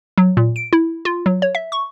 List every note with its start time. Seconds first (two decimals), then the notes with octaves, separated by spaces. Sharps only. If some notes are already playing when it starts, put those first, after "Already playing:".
0.18 F#3
0.37 A#2
0.56 D7
0.73 E4
1.05 F4
1.26 F#3
1.42 C#5
1.55 E5
1.72 C#6